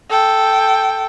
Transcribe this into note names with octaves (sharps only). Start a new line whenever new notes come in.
A4 G5